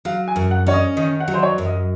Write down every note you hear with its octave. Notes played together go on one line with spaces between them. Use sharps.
F#3 F5
G#5
F#2
F#5
C#4 C#5
D#5
D#3 D#5
F#5
F#3
C5
C#5
F#2
D#5